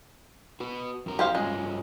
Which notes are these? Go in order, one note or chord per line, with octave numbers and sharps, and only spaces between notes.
F#4 B4
F2 A#4
G4 C5 F5
G2 G#3 C#4 F4